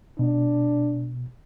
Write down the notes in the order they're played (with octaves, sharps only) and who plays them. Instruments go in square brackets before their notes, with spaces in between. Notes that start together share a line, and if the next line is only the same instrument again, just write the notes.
[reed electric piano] B2 [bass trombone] D4